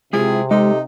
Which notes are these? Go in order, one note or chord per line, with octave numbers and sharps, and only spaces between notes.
C3 G#3 E4 F4 G#4
G#3 D#4 G4 A4